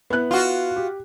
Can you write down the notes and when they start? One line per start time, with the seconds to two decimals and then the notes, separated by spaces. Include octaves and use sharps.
0.10 B3 E4 F#6
0.31 F4 F#4
0.76 G4